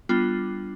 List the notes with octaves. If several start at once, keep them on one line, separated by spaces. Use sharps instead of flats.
G3 B3 D4 F4